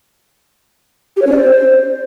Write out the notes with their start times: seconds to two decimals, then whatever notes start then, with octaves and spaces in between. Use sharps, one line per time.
1.17 G4
1.22 C#5
1.27 C#4
1.32 D5
1.37 C5